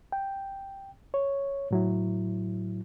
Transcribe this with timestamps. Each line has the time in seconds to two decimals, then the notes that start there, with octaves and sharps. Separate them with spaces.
0.12 G5
1.14 C#5
1.71 A2 F#3 E4